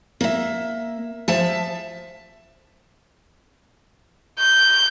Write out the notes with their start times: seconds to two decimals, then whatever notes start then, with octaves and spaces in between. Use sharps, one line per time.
0.21 A#3 E5
1.28 F3 E5 A5
4.39 G6